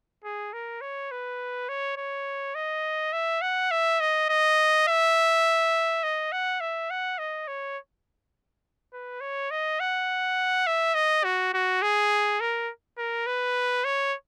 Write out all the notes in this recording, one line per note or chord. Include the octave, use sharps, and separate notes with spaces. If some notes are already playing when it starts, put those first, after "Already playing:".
G#4
A#4
C#5
B4
C#5
C#5
D#5
E5
F#5
E5
D#5
D#5
E5
D#5
F#5
E5
F#5
D#5
C#5
B4
C#5
D#5
F#5
E5
D#5
F#4
F#4
G#4
A#4
A#4
B4
C#5